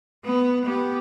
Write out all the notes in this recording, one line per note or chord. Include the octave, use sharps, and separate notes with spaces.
B3
B3 G4